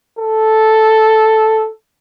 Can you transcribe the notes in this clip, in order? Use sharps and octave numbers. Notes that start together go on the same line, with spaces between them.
A4